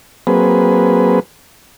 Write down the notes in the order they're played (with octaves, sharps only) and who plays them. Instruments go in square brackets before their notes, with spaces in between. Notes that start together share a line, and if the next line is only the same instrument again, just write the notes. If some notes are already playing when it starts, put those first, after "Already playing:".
[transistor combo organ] F#3 A#3 C4 G#4 B4